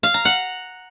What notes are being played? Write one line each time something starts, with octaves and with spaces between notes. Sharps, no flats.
F5
A#5
F#5